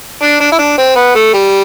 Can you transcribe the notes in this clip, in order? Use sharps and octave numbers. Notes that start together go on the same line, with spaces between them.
D4
D4
E4
D4
C4
B3
A3
G3